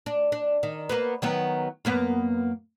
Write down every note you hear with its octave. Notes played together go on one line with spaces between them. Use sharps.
D4
D4
D#3
A#3 B3 B4
D#3 F#3 B3
F#2 A#3 B3